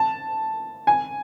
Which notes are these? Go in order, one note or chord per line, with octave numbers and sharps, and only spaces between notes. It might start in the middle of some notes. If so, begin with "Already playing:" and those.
Already playing: A5
G#5